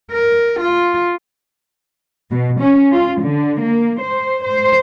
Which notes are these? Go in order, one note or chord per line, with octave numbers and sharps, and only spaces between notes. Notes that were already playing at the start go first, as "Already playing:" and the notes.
A#4
F4
B2
C#4
F4
D3
A#3
C5
C5